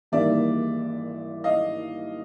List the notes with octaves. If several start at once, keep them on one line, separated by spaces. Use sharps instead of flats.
G#1 G#2 E3 G3 A#3 D5 E5
D#5 F5